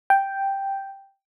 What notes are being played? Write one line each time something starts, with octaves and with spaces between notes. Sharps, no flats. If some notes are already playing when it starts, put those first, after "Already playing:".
G5